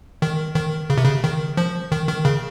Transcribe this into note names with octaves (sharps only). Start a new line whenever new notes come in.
D#3
D#3
C#3
C3
C#3
D#3
F3
D#3
D#3
C#3